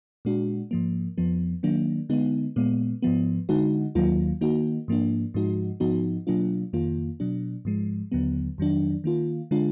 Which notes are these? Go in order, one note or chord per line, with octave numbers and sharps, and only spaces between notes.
A#2 G#3 D4 F#4
G#2 F3 A#3
F2 F3 B3
D#3 F#3 A#3 D4
D3 G#3 B3 D#4
A#2 G#3 B3
G#2 F3 B3
D3 G#3 D#4 F#4
D#2 D#3 F#3 A#3 F4
D#3 A#3 D#4 F#4
G#2 F3 A#3 D4
G#2 F3 G#3 D#4 F#4
G#2 F3 B3 D#4 F#4
B2 F#3 A#3 D4 F4
F2 D#3 A#3 F4
B2 F#3 D4
G#2 F3 G#3
D#2 D3 F#3 B3
F2 D#3 F#3 D4
D#3 A#3 F4
D3 G#3 D4 F4